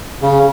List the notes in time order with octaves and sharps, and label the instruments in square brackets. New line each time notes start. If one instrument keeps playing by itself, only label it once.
[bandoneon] C#3